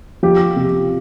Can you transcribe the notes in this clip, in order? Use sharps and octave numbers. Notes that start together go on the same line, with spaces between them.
F3 G4
C3